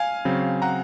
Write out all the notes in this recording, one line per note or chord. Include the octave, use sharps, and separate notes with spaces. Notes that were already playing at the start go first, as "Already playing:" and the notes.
Already playing: F5 G#5
C#3 F#3 C4
F#5 A#5